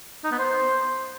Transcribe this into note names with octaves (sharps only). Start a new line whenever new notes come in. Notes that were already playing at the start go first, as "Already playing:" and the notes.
D#4
B3
C5